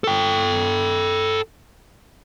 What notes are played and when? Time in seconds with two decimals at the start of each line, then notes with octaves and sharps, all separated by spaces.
0.04 A4 G5